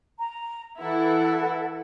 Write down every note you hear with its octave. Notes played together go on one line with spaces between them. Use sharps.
A#5
E3 E4 A4 F#5